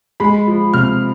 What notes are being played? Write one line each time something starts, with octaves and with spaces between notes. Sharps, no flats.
G#3 B5
F3
C3 F6